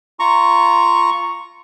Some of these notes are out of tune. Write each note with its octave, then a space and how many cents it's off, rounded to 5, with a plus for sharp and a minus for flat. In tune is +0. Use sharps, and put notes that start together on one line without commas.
F4 -15 A#5 -5 C#6 +0